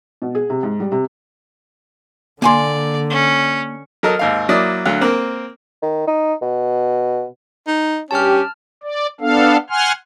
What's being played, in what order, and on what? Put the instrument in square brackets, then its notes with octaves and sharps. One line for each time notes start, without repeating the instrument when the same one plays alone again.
[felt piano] B2
G#4
C3
G#2
G3
C3
[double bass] D3 [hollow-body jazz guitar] A#3 G#5 C6 [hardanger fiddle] D5
[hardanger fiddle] C#4
[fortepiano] F#3 A4 A#4 D#5
G#1 D#2 F5
F#3 A#3 E4 D5 D#6
D2 F#3 F5
A#3 C4 A#4
[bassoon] D#3
D#4
B2
[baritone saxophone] D#4
[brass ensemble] G2 G4 [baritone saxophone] C#4 [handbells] A5 F6
[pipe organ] D5
B3 D4 A4 F5
F#5 G#5 C6 F6